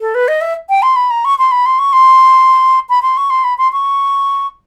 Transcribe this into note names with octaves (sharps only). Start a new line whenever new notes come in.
A4
B4
D#5
E5
G5
C6
B5
A#5
C#6
C6
B5
C6
C#6
C6
B5
C6
C#6
C6
B5
C6
C#6